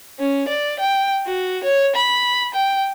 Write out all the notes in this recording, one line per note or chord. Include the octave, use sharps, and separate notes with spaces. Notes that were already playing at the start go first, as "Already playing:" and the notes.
C#4
D5
G5
F#4
C#5
B5
G5